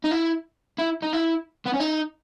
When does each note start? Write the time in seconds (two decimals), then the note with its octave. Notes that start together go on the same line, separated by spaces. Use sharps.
0.04 D#4
0.11 E4
0.79 E4
1.03 D#4
1.13 E4
1.66 B3
1.73 C#4
1.80 D#4